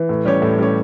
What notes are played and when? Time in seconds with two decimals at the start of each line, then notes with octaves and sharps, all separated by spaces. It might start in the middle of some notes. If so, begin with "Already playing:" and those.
Already playing: E3
0.09 A2
0.25 G3 C#4 G4 C#5
0.42 A2
0.59 G3 C#4 G4 C#5